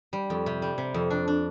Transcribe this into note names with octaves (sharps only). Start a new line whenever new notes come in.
G3
F2
C3
G3
C3
F2
D4
D4